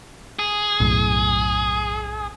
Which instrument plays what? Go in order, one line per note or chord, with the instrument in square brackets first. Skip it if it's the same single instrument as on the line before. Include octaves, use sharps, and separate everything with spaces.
[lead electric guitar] G#4
[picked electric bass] B1 F#2 A2